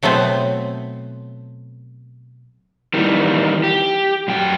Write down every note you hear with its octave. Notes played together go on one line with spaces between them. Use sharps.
B2 F#3 A3 B3 C4
D#3 E3 G3
G4
F#2 G5